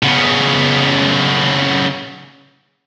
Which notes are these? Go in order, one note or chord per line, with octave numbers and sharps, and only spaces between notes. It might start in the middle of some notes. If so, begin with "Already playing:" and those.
C#3 B3